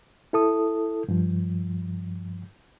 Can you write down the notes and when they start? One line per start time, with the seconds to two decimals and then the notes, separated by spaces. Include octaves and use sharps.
0.33 E4 A4 D#6
1.09 G2 F3